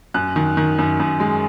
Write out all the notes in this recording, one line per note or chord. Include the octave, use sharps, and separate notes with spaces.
F#2 F#6
D#3
D#3
F#2
F#2
G#3